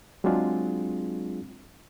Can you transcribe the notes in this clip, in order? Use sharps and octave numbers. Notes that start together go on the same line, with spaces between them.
F#3 G#3 C4 D4 F4 G#4